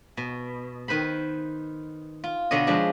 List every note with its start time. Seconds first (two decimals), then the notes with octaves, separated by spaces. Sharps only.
0.17 B2
0.88 D#3 B4 C5 B5
2.24 F4
2.51 B2 D3 C#5 D#5
2.67 F3 G#3 D4 B4